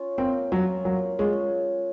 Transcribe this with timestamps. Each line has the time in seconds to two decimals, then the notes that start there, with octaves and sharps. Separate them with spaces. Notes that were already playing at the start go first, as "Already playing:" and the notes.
Already playing: C#4 F4
0.18 A#3 C4
0.52 F#3 C#4 F4
0.85 F#3 A#3
1.19 G#3 C#4 F4